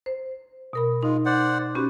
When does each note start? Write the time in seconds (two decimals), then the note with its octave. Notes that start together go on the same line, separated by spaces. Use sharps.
0.06 C5
0.73 B2 A#4 B5
1.03 G#3 D#4 F4
1.25 C5 D5 F#5
1.75 C#4 F#4 G4 B4